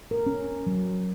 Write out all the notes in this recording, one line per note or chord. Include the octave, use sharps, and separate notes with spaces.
A#4
C#4
F#3